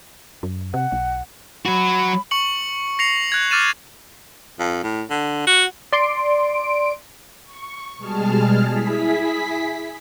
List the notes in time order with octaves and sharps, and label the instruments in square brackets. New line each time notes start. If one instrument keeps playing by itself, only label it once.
[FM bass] F#2
[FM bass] C3 [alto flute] F#5
[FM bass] B1
[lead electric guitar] F#3 F#4 [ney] B5
[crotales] C#6 C#7 F#7
A#6 C7 C#7 F7
F#6 G#6
D6 F6 A6 D#7 E7
[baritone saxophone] F2
A2
D3
F#4
[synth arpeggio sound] D5 C6 D7
[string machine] C#6
B2 G3 G#3 G#4 A5 F6
E4 G#4 B6